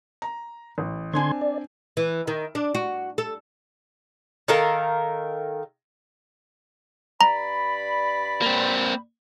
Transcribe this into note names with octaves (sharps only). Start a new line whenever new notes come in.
A#5
A1
D3 C4 D4 G#5 C6 G#6
D5
E3
D#3
D4
F#4
A4
D#3 A4 A#4 F5
G2 D5 A#5 B5
A#3 C4